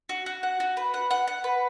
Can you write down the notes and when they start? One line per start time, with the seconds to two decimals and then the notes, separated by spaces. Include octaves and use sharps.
0.09 F#4
0.26 F#4
0.43 F#5
0.60 F#4
0.77 B4
0.94 F#5
1.10 F#5
1.27 F#5
1.44 B4